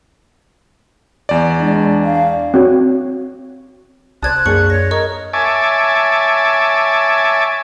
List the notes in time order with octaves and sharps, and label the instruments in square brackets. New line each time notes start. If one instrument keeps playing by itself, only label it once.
[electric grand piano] E2 D5
[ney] G#3 [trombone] D4
[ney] F5
[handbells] C4 F#4 C#5
[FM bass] C2 [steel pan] C5 D5 A5 [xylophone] D#6 G#6 [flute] F#6
[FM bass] F#2 [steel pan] A#3 D4 G#4 [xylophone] C#6 C#7 F#7
[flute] C#5 [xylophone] A#6
[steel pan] A#4 [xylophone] D#5 C#6 D#6
[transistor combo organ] C#5 E5 G#5 A5 D6